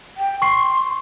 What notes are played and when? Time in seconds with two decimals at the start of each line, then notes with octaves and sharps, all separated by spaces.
0.17 G5
0.42 C6 C#6 C7